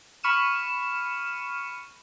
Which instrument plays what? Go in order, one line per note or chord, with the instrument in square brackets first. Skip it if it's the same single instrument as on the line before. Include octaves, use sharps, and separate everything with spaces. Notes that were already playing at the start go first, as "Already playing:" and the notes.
[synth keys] B5 C#6 F6 C#7 D#7 E7